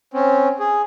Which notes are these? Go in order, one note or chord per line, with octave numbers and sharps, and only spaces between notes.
C4 C#4
G#4